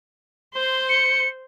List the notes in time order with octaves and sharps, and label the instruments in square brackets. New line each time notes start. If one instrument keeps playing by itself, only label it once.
[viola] C5 C6
[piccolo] C#7